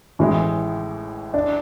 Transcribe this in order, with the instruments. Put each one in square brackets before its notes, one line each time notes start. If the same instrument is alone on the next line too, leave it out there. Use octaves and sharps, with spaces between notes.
[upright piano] A1 A2 E3 G#3
[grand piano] D4